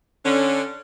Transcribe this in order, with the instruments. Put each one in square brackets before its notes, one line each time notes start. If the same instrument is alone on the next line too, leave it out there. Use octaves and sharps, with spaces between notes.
[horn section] D3 C#4